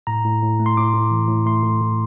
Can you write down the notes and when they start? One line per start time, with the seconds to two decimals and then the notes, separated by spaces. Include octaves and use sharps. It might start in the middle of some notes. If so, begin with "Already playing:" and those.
0.07 A2 A#5
0.24 A2
0.43 A2
0.59 A3
0.66 C6
0.77 A2 D6
0.94 A2
1.11 E3
1.28 A2
1.46 A3 C6
1.63 A2
1.82 A2